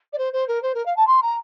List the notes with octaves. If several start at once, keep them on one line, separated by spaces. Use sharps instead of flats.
D5
C5
C5
A#4
C5
A#4
F5
A5
C6
A#5